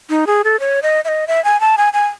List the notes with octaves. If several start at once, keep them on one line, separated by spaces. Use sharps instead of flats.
D#4
G#4
A4
C#5
D#5
E5
D#5
E5
G#5
A5
G#5
G#5